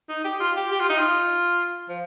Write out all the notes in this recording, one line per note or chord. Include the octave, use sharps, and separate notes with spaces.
D#4
G4
F4
G4
G4
F4
D#4
F4
F3